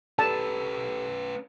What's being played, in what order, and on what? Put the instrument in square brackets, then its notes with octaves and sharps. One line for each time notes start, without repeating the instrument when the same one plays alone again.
[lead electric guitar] C#4 B4 [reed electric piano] G4 A4 E6 [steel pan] A5